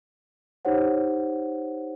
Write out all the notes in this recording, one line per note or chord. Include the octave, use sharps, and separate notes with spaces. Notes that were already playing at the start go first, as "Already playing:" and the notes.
D#4 G4 C5 C#5 F#5